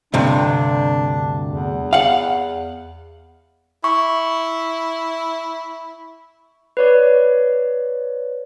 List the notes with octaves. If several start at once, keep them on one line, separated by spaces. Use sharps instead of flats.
D2 G2 C3 D4
E2
F5 F#5
E4 C#6
B4 C#5 D5